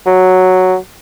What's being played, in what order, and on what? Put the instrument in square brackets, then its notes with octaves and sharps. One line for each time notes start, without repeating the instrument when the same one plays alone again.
[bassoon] F#3